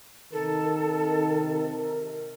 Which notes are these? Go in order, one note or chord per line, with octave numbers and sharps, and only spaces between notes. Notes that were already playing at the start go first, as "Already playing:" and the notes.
C3 D#3 A4 A#4